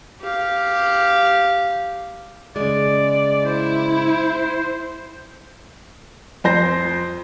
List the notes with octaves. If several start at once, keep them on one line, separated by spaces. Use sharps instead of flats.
G4 F5
C#3 G#3 D5
E4 C5
F2 C5 A#6